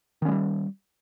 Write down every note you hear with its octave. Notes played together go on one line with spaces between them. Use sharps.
D#3 G3 G#3 C#4